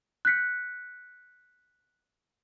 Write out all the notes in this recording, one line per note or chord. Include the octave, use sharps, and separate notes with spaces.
F#6 G6 B6 C#7